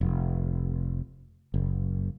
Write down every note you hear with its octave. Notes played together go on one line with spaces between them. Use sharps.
F1
F#1